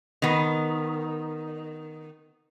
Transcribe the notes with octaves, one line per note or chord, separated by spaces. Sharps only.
D#3 B3